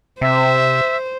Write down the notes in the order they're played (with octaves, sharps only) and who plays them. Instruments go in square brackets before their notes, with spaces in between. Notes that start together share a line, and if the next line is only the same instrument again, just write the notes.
[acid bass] C3 [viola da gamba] C5 [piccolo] E5